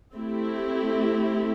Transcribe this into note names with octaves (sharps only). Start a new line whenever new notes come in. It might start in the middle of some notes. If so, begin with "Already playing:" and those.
A3 C4 E4 G4